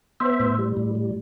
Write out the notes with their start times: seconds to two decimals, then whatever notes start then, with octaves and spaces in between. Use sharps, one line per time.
0.20 B3 C5 E5
0.40 A2
0.58 G3
0.77 A2
0.95 G3